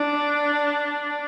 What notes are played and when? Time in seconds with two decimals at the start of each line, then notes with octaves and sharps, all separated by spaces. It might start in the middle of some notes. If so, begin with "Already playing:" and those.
Already playing: D4